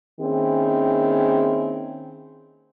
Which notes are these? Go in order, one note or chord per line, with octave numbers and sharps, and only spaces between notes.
D#3 A#3 C4 C#4 E4 G#4